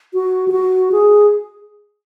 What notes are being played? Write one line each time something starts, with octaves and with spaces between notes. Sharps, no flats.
F#4
G4
F#4
G#4